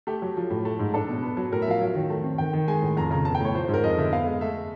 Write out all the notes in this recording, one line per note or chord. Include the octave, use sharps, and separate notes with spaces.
A3 G4
F#3
F3
A2
A3
G#2
D4 A4
B2
B3
F#3
A2 A#4
E5
F3 F5
F#3
D#3
A3
C4
D#3 G5
D#3
G#3 G#5
A2
F2 A#5
C#3 A#5
B3 A5
G5
A2 C#5
F3 C5
C5
G#2
A#4
F2 D#5
D3 E5
B3 F5
G#3
A3 E5